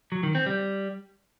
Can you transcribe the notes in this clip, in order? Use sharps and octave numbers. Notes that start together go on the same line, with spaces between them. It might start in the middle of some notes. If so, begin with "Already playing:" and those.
F#3
D#3
C4
G3